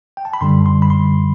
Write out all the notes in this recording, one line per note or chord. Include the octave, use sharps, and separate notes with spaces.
G5
A5
B5
F#2 D3 G3 C6
C6
B5
C6